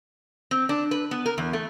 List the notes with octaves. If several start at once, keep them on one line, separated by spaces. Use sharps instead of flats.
C4
D4
B4
B3
A#4
E2
A3